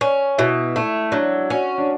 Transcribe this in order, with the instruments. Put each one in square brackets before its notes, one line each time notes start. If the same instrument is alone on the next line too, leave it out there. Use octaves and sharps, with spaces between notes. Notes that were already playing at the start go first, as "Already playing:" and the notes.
[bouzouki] C#4
[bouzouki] B2 [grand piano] E4
[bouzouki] A3 [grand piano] E4
[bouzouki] F#3 [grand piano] D4
[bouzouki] C#4 [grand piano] F#4
[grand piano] D4